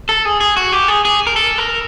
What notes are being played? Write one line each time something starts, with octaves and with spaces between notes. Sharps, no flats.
A4
G#4
G#4
F#4
G4
G#4
G#4
A#4
A4
A#4